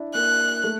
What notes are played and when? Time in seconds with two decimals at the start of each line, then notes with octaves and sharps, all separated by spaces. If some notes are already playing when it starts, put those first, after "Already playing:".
Already playing: D4 E4
0.14 A#3 F#6
0.64 A3